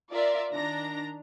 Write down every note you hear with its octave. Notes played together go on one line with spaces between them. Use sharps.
F4 A#4 D5 E5
D#3 D4 A#5 A#6